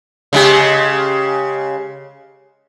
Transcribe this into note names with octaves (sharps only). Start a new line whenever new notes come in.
C#3 G#3 G4